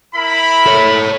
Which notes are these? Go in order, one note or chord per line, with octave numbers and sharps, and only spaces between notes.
E4 A#4 B5
A4 C#5